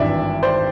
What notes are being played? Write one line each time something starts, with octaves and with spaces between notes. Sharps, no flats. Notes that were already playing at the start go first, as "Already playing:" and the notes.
Already playing: G#1 G2 E3 D5 E5
C5 D5